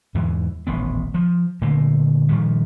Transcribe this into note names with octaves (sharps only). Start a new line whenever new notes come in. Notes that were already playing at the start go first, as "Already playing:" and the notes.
E2 G#2 E3
D#1 A1 B3
F3
A#2 D3 A3 A#3
A#2 D#3 F3 G3